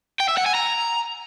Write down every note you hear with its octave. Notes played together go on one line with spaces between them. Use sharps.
G5
E5
F#5
G#5
A#5